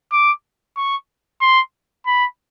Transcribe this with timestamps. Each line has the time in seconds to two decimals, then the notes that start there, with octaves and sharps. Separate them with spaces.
0.12 D6
0.77 C#6
1.41 C6
2.06 B5